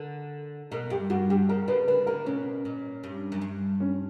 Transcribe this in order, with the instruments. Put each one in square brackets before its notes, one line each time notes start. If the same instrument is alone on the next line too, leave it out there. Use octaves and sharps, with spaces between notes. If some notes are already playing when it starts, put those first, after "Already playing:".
Already playing: [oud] D3 [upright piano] A#4
[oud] B2 [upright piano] A#4
[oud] G2 [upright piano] G4
[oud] G2 [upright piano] F#4
[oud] G2 [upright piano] G4
[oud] C#3 [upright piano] A#4
[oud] C#3 [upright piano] B4
[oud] D3 [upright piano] B4
[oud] D3 [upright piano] A#4
[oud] B2 [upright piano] C#4
[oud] A#2
G2
F#2
G2
[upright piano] C#4